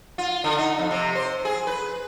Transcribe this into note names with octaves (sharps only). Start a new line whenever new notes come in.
F4
D3
D#4
F2
C3
C5
G#4
B4